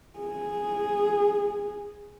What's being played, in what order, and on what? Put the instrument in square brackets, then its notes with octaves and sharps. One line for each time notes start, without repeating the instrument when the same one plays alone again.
[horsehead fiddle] G#4